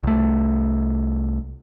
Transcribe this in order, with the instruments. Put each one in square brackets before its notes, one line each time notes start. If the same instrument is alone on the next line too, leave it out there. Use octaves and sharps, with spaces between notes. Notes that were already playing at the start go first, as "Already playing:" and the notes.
[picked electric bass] C2 A3